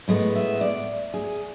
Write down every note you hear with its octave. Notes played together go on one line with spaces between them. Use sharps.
A2 G#3 B3
E5
D5
G#4